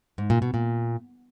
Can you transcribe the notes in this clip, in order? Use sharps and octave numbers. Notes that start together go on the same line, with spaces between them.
G#2
A#2
B2
A#2